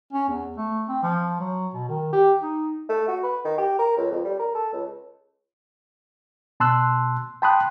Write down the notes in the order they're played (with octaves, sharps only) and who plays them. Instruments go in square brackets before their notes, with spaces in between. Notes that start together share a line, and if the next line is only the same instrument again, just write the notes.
[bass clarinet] C#4
E2
A3
C4
F3
F#3
B2
D#3
G4
D#4
[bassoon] A3
F#4
B4
D#3
G4
A#4
C#2
F2
G3
A#4
A4
C#2
[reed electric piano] B2 A5 C6 E6 F#6
G5 A5 B5 C6 D#6 F#6